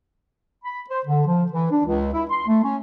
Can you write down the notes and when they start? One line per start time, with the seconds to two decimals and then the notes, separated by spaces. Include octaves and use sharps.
0.64 B5
0.89 C5
1.06 D3
1.27 F3
1.52 E3
1.70 D4
1.85 C#2
2.13 E4
2.30 C6
2.47 A3
2.63 C#4